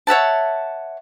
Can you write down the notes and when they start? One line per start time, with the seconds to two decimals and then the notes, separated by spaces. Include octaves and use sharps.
0.07 C#5 E5 F#5 A5